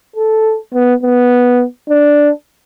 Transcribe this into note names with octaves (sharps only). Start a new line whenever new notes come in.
A4
B3
B3
D4